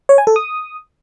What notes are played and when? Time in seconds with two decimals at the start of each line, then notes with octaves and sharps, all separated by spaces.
0.09 C#5
0.18 G#5
0.27 A4
0.36 D#6